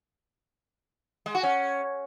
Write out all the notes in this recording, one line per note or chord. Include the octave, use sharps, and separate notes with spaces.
G#3
F#4
C#4